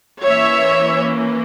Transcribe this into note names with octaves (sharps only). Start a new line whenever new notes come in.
E3 A#3 C#4 C#5 E5